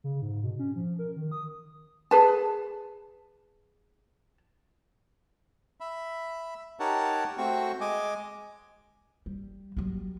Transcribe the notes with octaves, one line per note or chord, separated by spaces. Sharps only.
C#3
G#2
B2
C#4
F3
A#4
D#3
D#6
G#4 B4 A5
E5 B5
D#4 G4 A#4 C#5 F#5 A5
A3 C4 F#4 C#6
G#3 D#5 G#5 D6
G3
F#3 G3